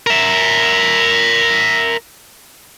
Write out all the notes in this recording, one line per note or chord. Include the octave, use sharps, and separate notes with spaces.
A#4 E5